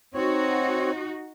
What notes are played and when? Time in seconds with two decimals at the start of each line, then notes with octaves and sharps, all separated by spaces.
0.14 C4 D#4 F#4 C#5